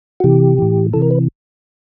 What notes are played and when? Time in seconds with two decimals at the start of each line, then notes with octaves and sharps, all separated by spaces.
0.20 F#4
0.24 C3 E3 G4
0.58 A2 E3
0.93 C3 E3 A4
1.02 A#4
1.11 B4